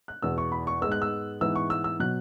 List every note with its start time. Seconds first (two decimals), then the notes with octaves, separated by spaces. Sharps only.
0.08 F#6
0.22 E2 B2 B3 E6
0.38 C#6
0.52 B5
0.67 C#6
0.82 G#2 G#3 B3 E6
0.92 F#6
1.02 E6
1.41 G#2 E3 B3 E6
1.55 C#6
1.70 E6
1.84 E6
2.00 B2 F#3 F#6